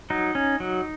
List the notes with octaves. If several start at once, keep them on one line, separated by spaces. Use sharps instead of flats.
F#3 D#4
C#4
F#3